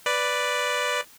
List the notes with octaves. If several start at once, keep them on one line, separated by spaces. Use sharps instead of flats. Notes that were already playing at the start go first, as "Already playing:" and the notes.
B4 D5